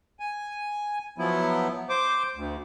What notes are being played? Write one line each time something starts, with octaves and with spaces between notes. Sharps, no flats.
G#5
F3 F#3 B3 E4
C5 D6
D2